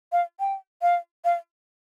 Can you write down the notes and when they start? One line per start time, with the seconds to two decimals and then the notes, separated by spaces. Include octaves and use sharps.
0.12 F5
0.40 G5
0.82 F5
1.25 F5